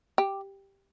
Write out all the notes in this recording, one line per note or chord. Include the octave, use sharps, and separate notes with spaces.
G4